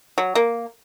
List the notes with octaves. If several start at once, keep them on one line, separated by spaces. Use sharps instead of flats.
F#3
A#3